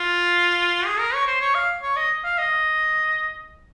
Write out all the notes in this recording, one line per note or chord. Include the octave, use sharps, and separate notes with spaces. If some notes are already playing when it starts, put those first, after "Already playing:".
Already playing: F4
G#4
A#4
C#5
C5
C#5
F5
C#5
D#5
F5
D#5